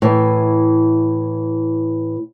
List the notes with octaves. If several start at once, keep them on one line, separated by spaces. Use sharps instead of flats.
A2 E3